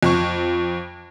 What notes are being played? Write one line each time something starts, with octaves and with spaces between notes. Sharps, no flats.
F2 C#6